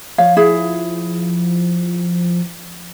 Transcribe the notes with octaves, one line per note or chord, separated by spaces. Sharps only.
F3 C#5 F5
E4 G#4